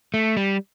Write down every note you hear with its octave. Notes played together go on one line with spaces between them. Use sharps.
A3
G3